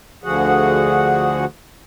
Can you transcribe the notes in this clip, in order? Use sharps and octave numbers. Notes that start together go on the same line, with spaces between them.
D2 D3 F3 F#4 G#4 F#5